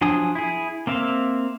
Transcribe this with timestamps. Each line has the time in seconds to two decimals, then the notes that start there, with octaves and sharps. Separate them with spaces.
0.01 F3 F#3 D4 G#5 D#6
0.35 E4 G#4
0.87 A#3 C4 E5 F5